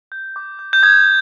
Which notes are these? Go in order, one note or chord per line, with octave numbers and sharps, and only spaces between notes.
G6
D6
G6
G6
D#6 G#6